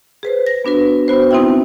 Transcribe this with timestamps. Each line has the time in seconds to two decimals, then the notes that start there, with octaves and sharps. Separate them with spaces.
0.23 G#4 B4 C5
0.47 A#6
0.65 B3 D4 F#4 B4
1.08 B3 F#4 C5
1.31 C4 D#4 E4 E5 G5